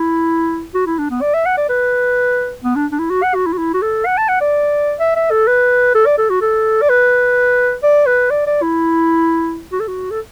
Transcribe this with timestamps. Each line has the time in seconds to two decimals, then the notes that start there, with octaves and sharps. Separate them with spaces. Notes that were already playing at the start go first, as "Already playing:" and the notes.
Already playing: E4
0.75 F#4
0.87 E4
0.99 D4
1.11 B3
1.22 D5
1.34 E5
1.46 F#5
1.58 D5
1.69 B4
2.64 B3
2.76 D4
2.92 D4
2.99 E4
3.11 F#4
3.23 F#5
3.35 F#4
3.46 E4
3.53 F#4
3.59 E4
3.74 F#4
3.82 A4
4.06 F#5
4.18 A5
4.29 F#5
4.41 D5
5.00 E5
5.16 E5
5.31 A4
5.48 B4
5.95 A4
6.06 D5
6.18 A4
6.30 F#4
6.42 A4
6.82 D5
6.90 B4
7.83 D5
8.07 B4
8.30 D5
8.47 D5
8.62 E4
9.72 F#4
9.80 A4
9.88 F#4
10.11 A4